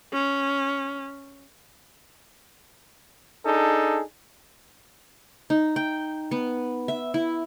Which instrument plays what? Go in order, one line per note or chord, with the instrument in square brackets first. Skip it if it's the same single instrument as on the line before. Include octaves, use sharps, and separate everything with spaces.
[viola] C#4
[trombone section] D4 D#4 G#4 A4
[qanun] D#4
G5
B3
E5
E4